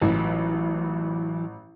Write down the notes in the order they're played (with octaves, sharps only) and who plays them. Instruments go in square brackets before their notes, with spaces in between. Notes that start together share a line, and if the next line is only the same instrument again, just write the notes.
[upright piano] A1 [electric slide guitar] E3 F#3